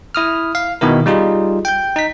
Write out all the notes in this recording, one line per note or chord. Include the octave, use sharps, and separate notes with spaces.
E4 D#6 F6
F5
B2 D#3 E4 A#4
G3 D#4 F4 G#4
G5 G6
D#4 B6